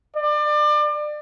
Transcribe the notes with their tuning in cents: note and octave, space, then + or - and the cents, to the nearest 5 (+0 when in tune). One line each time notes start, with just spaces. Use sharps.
D5 +30